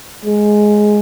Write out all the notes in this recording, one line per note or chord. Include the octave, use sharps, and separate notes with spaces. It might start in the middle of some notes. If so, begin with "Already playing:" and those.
G#3